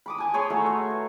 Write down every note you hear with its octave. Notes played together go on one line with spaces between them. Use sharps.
B5 D6 D#6
G#5 A5
G#4 C#5 B5 C6
A3 F#4 F#5 A#5
E5
B4